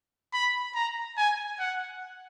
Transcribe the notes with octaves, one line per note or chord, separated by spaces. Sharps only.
B5
A#5
G#5
F#5